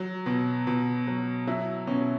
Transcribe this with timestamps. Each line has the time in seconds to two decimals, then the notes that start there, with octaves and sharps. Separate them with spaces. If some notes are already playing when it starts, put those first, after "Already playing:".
Already playing: F#3
0.26 B2
0.67 B2
1.07 F#3
1.47 F#3 E4
1.87 B2 C#4